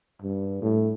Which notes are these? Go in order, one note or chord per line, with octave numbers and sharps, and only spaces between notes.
G2
A2